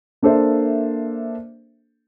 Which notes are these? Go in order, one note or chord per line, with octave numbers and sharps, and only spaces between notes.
A#3 D4 A4 C5 E5